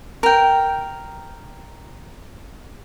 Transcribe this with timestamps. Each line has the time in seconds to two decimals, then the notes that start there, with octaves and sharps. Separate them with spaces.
0.23 A#4 G5